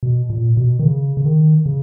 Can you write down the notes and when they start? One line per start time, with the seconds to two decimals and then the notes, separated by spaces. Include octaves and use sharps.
0.03 B2
0.30 A#2
0.57 B2
0.79 D#3
0.85 C#3
1.17 C#3
1.25 D#3
1.66 C#3